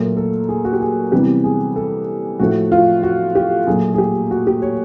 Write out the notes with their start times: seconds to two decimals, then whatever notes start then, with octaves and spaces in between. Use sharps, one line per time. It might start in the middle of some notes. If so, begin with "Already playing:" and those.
Already playing: A#2 F#3 A3 A#4
0.17 A4
0.49 G#4
0.65 F#4
0.73 G4
0.81 G#4
1.12 C3 E3 G3 B3 G4
1.44 G#4
1.76 A4
2.39 A2 F3 A3 F#4
2.72 F4
3.03 F#4
3.35 G4
3.67 A#2 F#3 A3 G#4
3.94 G#4
3.98 G4
4.31 F#4
4.47 G4
4.62 C#5